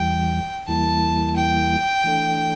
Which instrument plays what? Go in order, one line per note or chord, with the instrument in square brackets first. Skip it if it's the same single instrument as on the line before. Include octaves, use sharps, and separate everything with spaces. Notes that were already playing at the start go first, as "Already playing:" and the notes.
Already playing: [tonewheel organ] E2 E3 G3 [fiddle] G5
[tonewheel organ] E2 E3 G3 A#3 E4 [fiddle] A5
[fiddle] G5
[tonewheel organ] E3 A3 D4 A4